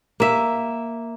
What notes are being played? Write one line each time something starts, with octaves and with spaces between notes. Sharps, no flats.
A#3 E5